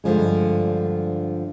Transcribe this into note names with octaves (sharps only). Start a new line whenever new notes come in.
G2 D3 F3 G#3